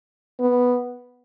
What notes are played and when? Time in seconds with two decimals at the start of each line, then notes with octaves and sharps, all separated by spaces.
0.40 B3